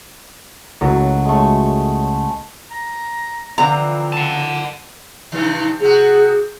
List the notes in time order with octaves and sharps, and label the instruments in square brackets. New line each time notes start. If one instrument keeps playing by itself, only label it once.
[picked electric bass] C#2 A2 [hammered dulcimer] F#3
[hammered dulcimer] G#3 A3
[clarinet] A#5
[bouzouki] D3 E3 F3 [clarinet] C4 [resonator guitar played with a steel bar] A#5
[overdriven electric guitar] F#5 A5
[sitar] G2 C3 D#3
[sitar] C3 F#4 [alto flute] G#4